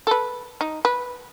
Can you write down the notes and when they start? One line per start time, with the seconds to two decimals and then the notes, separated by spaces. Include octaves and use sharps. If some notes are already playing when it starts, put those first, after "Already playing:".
0.07 A4 B4
0.61 D#4
0.85 B4